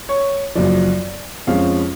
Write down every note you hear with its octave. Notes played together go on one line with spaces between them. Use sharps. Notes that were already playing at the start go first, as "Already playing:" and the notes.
C#5
F#1 F#2 F3 D5
F2 F3 G#3 C#4 F5